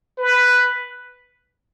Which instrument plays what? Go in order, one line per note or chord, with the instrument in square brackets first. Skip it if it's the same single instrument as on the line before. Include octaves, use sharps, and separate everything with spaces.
[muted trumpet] B4